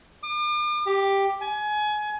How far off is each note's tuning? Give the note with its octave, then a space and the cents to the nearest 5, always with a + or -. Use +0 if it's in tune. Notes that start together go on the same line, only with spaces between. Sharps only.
D6 +45
G4 +5
G#5 +25